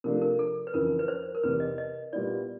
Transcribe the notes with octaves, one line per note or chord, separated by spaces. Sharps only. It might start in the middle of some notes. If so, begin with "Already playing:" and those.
C3 F3 A3 D4 A#4
A#4
A4
B4
F2 C#3 E3 A#4
B4
C5
A#4
E2 C3 E3 B4
D#5
D#5
A#2 G3 B3 E4 D5